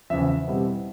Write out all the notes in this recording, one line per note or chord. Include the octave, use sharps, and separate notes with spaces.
E2 C#3 F3 E5
B2 G3 C4 E4